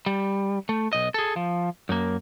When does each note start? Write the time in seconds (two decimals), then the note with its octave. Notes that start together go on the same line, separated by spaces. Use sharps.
0.06 G3
0.69 A3
0.93 B1 D#5
1.14 G#4 A4
1.36 F3
1.89 F#2 A#3